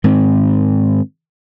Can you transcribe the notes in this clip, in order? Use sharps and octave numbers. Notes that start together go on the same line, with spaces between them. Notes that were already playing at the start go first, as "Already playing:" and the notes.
G#2 D#3 C4